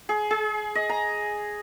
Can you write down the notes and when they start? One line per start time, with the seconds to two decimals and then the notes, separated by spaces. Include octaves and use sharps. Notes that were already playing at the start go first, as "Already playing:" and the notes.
0.09 G#4
0.31 G#4
0.75 D#5
0.89 A#5